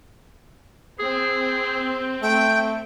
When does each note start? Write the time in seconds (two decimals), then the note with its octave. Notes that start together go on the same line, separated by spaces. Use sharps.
0.99 C4 G#4
2.23 A3 G5